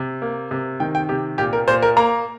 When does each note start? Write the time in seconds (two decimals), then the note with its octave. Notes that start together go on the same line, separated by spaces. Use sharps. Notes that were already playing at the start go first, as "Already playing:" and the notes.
Already playing: C3
0.22 A#3
0.51 C3
0.80 D#3 G5
0.95 G5
1.09 C3 G4
1.38 A#2 G4
1.53 A#4
1.68 A#2 C5
1.82 A#4
1.97 A#3 A#5